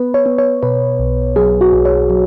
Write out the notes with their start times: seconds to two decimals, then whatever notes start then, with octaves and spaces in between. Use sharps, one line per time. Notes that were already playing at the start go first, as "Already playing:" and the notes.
Already playing: B3 B4
0.14 C#5
0.26 B3
0.38 C#5
0.63 B2 B4
0.99 B1
1.36 F#3 G#4
1.61 F#4
1.73 B1
1.85 C#5
2.10 F#3